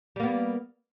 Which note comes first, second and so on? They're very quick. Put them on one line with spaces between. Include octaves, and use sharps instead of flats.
G3 A#3 B3